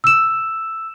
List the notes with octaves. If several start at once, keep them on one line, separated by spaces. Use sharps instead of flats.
E6 E7